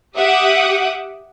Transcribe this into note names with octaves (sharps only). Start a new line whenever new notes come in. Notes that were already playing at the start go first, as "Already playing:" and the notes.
G4 E5 F#5 D6 D#6